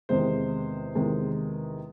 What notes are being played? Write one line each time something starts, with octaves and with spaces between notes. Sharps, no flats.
E2 C3 D#3 G#3 C5
E2 C3 D#3 G#3